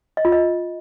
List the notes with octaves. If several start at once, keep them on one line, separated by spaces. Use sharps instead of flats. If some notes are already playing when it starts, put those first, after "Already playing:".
D#5
F4
D#5